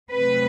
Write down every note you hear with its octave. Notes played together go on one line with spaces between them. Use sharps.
C3 F#3 A3 C4 B4